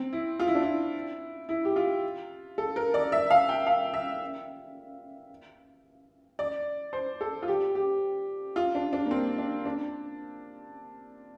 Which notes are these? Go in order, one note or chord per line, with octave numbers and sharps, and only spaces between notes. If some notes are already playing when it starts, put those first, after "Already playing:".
Already playing: C4
E4
F4
E4
D4
E4
E4
G4
F4
A4
A#4
D5
E5
F5
G5
F5
E5
D5
C5
A4
F4
G4
G4
F4
D4
D4
A#3
C4
D4
D4